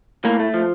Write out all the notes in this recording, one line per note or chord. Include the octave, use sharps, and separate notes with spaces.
A2 A#3
A3
F3